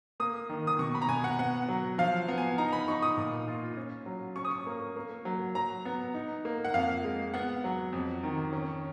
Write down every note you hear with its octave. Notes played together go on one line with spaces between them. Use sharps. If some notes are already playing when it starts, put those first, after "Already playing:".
A#3 D#6
D#3
D#6
B2 C#6
B5
A#5
B2 G#5
F#5
B3 F#5
F#3
F3 F5
B3
G#5
D#4 A#5
B5
D#4 C#6
D#6
A#2
F4
C#4
F#3
C#4 C#6
D#6
C#6
A#3
A#3
F#3
F#3 A#5
B3
D#4
A#3
F#5
F2 F5
G#3
B3 F#5
F#3
F2
D#3
C#4